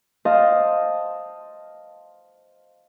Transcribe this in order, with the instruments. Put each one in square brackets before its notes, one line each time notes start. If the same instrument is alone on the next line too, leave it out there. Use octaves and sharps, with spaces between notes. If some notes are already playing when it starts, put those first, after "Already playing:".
[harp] C5 D#5 F5 A5